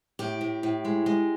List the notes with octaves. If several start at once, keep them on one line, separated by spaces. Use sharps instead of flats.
A2 G4
A2
A2
G#3
G#3